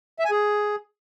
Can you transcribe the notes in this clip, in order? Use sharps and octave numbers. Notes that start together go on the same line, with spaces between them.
E5
G#5
G#4